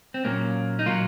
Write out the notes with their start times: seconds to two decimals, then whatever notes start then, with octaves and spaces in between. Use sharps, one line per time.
0.14 C4
0.25 A#2 F#3 A#3 C#4
0.79 D#4
0.86 A#2 F#3 A#3 F4